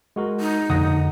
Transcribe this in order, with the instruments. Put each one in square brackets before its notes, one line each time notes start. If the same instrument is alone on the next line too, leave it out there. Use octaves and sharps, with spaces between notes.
[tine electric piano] G#3 F#4 A#4
[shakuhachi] D#4
[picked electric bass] F2 D3 [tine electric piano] D#5 F#5 D#6